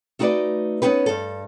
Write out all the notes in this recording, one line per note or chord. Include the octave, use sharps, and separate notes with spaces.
A3 D#4 F#4 A#4 B4 D5
B3 C#4 D#4 G4 B4
G2 A4